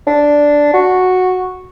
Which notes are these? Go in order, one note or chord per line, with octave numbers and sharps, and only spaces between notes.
D4
F#4